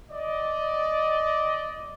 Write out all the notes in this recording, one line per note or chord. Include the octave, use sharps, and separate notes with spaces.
D5 D#5